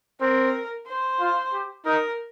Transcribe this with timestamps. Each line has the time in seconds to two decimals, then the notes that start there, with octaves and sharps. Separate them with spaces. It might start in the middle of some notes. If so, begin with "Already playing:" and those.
0.20 C4 A#4
0.87 C5
1.20 F4
1.53 G4
1.85 D#4 A#4